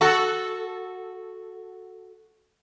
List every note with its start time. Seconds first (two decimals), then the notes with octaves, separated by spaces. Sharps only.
0.01 F#4 A4